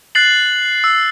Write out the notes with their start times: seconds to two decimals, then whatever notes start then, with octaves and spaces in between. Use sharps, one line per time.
0.15 F#6 A6 C7 F#7
0.84 E6